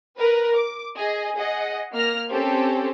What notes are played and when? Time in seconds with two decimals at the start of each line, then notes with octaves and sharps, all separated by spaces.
0.18 A#4 B4
0.55 D6
0.97 G#4 D#5 G#5
1.38 G#4 D#5 F#5
1.92 A#3 F6 A#6
2.29 C4 C#4 G4 A4 C5